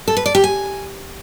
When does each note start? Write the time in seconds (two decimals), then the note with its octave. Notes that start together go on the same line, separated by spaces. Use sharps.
0.08 A4
0.17 B4
0.26 D5
0.35 G4
0.44 G#5